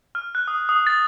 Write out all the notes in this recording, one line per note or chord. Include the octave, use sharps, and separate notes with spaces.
F6
F#6
D#6
D#6
A6